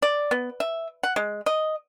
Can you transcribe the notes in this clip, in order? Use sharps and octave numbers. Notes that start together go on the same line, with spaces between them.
D5
B3
E5
F#5
G#3
D#5